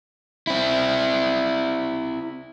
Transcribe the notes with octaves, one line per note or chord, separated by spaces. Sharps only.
C4 E4